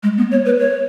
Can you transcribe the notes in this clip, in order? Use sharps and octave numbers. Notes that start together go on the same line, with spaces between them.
G#3
B3
C#5
B4
C#5